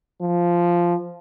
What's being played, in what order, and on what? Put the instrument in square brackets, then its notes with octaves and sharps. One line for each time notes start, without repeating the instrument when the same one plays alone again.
[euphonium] F3